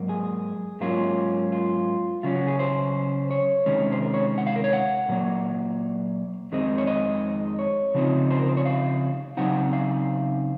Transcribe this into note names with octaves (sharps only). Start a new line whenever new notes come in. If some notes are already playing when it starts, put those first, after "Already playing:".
Already playing: G#2 F#3 A#3
G#4
G#2 F#3 A#3 C#4 F4
F4
C#3 F#3 C#4 F4
F#4
G#4
C5
C#5
C3 D#3 G#3 C#4
C5
A#4
C#5
F#5
F5
A#4
C#5
F#5
A#2 F#3 A#3
F2 D#3 G#3 C4 D#4
C#5
D#5
C#5
C#3 F3 C4 D#4
C5
A#4
C5
C#5
F5
C#3 F#3 C4 D#4 F#5
F5